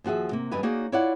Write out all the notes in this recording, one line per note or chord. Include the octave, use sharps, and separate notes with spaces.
D#2 F3 F#4 G#4 E5
C3 A#3
F#2 D3 G3 B4 D#5 G#5
A#3 D#4 F#4 G#4 C#5 D5
E4 F4 C#5 D5 E5 F#5